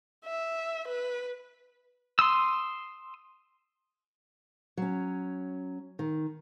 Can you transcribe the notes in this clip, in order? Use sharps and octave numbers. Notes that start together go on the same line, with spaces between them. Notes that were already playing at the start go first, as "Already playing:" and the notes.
E5
B4
C6 D#6 E6
F#3 C#4
D#3